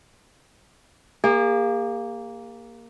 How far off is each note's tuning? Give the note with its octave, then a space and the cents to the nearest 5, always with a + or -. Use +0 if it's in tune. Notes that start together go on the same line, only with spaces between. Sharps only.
A#3 +0 G#4 -45